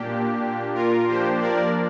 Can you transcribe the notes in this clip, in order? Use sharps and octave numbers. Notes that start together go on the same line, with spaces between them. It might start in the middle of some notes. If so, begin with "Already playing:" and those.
Already playing: A#2 A#3 D4 G4
F4 A#4
F3 A#3 D4 G4 C5
A#4 D5